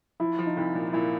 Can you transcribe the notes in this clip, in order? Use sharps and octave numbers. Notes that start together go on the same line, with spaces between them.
F3 E4
F3
D#4
C2 E4
A#2
A#2 E4